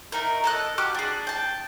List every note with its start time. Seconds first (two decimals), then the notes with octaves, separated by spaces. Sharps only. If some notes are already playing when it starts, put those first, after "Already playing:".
0.12 A3 D#4 A#4
0.44 A4 D#5 F#6
0.78 F#4 G4 D6 F6
0.95 D4 G#4
1.27 G5 A5